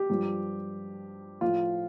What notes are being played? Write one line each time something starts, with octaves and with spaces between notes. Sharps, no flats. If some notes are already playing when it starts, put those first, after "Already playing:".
Already playing: G4
G2 F3
A2 F3 F4